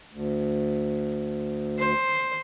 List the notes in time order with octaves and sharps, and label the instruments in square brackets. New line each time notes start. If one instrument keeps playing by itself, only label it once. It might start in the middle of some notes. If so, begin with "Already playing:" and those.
[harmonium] D2
[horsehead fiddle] C5